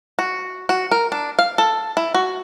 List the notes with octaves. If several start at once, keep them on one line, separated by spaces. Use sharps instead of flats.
F#4
F#4
A#4
D4
F5
A4
E4
F#4